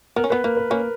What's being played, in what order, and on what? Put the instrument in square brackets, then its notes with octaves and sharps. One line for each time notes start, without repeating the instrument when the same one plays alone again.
[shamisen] B3 [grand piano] A#4
[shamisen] C#4
[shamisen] B3 [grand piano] B4
[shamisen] A#3 [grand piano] A#4
[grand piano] B4
[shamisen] A#3 C#4 [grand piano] A#4